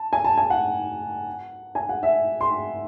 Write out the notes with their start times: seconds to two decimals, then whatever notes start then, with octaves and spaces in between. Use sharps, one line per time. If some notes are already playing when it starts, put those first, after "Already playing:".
Already playing: A5
0.13 G#5
0.24 A5
0.37 G#5
0.50 F#5
1.75 G#5
1.89 F#5
2.03 E5
2.41 C6